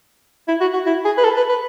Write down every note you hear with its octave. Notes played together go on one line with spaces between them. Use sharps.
E4
F#4
F#4
E4
G#4
B4
A4
B4
B4